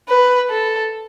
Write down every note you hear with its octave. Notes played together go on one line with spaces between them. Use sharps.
B4
A4